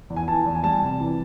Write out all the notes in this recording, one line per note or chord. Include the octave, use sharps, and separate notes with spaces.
E2
G#5
E3 A5
E2
G#5
G3 A5
C3
E3